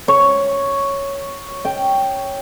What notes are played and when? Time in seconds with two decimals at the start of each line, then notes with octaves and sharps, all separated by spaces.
0.08 C#5
1.65 G5